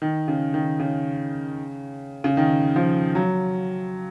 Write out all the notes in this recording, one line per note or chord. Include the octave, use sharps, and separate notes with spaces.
D#3
C#3
D#3
C#3
C#3
D#3
F3
F#3